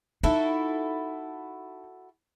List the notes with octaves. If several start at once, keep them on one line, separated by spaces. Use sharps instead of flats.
D#4 E4 F#4 A4